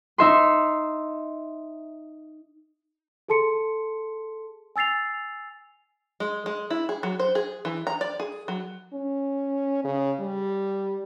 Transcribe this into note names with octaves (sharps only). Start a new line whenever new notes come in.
D#4 E5 C6
G#4 A4 A5 C6 C#7
G#5 E6 A6 C7 F7
G#3
G#3
E4
G#4
F#3
C5
G#4
E3
A#5
D5
G#4
F#3
C#4
C#3
G3